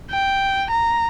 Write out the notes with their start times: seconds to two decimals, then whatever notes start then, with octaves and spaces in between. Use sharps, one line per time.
0.11 G5
0.71 A#5